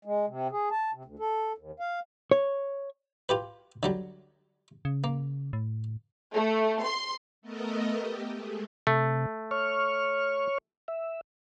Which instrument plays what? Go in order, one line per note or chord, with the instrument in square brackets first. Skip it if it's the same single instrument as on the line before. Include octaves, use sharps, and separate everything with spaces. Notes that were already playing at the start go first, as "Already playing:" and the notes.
[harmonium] G#3
C3
G#4
A5
C3
D2
A4
D#2
F5
[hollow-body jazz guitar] C#5
[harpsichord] F4 G4 B4
D3 F#3 G3
[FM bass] C#3
[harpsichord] A#3
[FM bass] A2
[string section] A3
C6
[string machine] A3 B3 A4 A#4 D#5
G4
G#3 A3
[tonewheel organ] C3 [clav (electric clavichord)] A3
[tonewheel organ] C#5 C#6 F6
E5